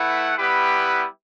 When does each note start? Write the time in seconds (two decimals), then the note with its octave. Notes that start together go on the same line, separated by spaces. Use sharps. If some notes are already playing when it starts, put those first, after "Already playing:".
Already playing: A3 E4 B4 F#5
0.37 G3 B3 E4 G4 B4